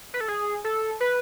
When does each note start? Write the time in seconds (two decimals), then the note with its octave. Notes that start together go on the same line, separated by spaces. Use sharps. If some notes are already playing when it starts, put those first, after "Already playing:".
0.14 B4
0.21 A4
0.28 G#4
0.64 A4
1.00 B4